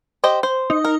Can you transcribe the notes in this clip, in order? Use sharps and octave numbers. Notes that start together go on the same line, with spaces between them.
G4 C5 D#5
C5
D#4
A#4